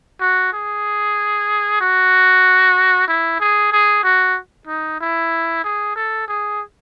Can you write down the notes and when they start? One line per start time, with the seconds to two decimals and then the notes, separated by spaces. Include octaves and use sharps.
0.21 F#4
0.53 G#4
1.81 F#4
3.08 E4
3.40 G#4
3.72 G#4
4.04 F#4
4.67 D#4
5.01 E4
5.64 G#4
5.96 A4
6.28 G#4